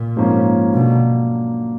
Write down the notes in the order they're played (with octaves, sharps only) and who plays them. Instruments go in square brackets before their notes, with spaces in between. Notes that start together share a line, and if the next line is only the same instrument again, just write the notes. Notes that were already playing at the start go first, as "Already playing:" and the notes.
Already playing: [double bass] A#2
[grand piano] G#2 F3 A#3 C#4
[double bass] B2 [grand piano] D3 F#3 A#3